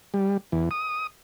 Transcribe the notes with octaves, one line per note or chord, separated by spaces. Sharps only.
G3
E2
D#6